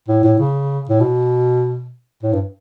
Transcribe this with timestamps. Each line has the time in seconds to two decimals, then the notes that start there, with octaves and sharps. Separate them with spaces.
0.08 A2
0.23 A2
0.39 C#3
0.89 A2
1.00 B2
2.23 A2
2.33 G2